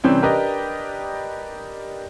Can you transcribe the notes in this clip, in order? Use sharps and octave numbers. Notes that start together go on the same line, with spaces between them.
C3 E3 G3 C4 C#4
D4 G4 A#4 B4 D5 D#5